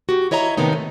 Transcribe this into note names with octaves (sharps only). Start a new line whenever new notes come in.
F#4 G4
E4 C#5 D#5 E5 A#5
A2 C3 D#3 A#3 B3 D#4
A3